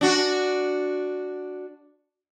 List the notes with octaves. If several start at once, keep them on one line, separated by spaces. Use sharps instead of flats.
D4 F#4